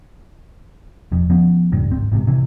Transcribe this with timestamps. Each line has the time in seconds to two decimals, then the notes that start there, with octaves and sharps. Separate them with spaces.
1.12 E1 F2
1.30 F3 B3 C#4
1.72 D#1 C#2 G2
1.92 G#1 C4
2.12 A1 G#2 C3
2.27 C3 E3